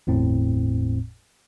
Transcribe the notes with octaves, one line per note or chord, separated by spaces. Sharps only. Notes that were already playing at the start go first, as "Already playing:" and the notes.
G1 E2 A2 C4